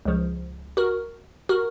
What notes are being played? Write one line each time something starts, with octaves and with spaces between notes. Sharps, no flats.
C#2 C#3 F3
F#4 A#4
F#4 A#4